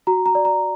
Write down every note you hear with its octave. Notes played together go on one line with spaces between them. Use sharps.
F#4 A#5
A#5
D5
A#5